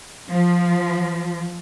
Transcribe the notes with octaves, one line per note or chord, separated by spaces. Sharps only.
F3